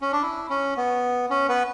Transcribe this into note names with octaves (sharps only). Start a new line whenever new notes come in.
C#4
D4
E4
C#4
B3
C#4
B3 B4